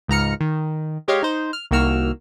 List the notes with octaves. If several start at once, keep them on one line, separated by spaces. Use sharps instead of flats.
C#2 G#2 A#5 F6 C#7
D#3
G#3 G4 C#5 D#5 F5
D#4 C5
F6
C2 D#3 A#3 F#4 E6 F6